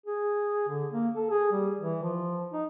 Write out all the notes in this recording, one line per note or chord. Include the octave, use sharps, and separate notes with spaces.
G#4
D3
A#3
A4
G#4
G3
E3
F3
D#4